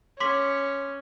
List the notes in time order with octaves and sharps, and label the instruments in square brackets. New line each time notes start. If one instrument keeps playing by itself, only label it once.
[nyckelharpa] C#4 [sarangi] C#5 [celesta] C6 D6 B6